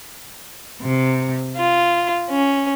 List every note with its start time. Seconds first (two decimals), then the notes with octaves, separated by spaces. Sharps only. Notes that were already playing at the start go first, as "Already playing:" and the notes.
0.82 C3
1.56 F4
2.30 C#4